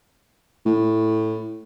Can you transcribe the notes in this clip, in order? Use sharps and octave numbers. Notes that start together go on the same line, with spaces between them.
A2